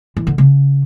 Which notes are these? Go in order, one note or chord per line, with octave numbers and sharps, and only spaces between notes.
E3
D3
C#3